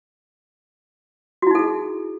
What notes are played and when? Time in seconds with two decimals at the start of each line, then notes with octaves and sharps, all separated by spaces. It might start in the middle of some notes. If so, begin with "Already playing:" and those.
1.42 F#4
1.47 E4
1.51 D#4
1.55 A4
1.59 G#4